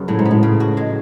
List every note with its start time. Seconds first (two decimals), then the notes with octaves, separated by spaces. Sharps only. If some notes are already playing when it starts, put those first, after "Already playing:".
Already playing: F#2 C#3 B3
0.08 A2 F#3
0.19 G#2
0.25 B3
0.31 A2
0.43 C#3
0.60 F#4
0.77 G#3